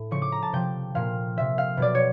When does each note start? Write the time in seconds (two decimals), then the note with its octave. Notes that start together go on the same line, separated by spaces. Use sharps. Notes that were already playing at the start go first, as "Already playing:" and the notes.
Already playing: A2
0.11 C#3 F3 C#6
0.22 D6
0.32 A#5
0.42 A5
0.53 C3 F3 G5
0.95 A#2 F3 F5
1.37 C3 F3 E5
1.58 F5
1.77 B2 F#3 D5
1.95 C#5